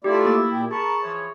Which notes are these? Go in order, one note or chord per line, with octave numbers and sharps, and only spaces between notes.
A3 E4 F4 G4 D5
A#3 A6
A#2 G4
G#4 A#4 A5 B5 C#6
E3 F3 C#5